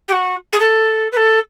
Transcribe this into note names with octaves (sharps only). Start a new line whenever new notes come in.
G4
F#4
G#4
A4
B4
A4